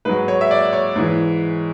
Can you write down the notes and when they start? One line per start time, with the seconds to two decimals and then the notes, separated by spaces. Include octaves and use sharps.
0.05 G#2 F#3 B4
0.28 C#5
0.41 E5
0.51 D5
0.73 C#5
0.96 G#2 E3